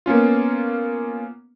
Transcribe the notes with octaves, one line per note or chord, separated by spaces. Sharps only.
A#3 B3 C#4 F4